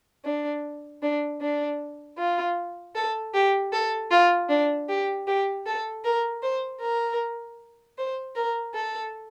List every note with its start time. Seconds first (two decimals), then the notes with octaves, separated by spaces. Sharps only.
0.25 D4
1.02 D4
1.41 D4
2.19 F4
2.95 A4
3.34 G4
3.73 A4
4.11 F4
4.49 D4
4.89 G4
5.27 G4
5.66 A4
6.04 A#4
6.43 C5
6.81 A#4
7.98 C5
8.36 A#4
8.74 A4